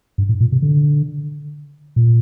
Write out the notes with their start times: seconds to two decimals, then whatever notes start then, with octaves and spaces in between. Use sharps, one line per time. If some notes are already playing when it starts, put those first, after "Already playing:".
0.18 G2
0.29 A2
0.40 A#2
0.52 C3
0.62 D3
1.96 A#2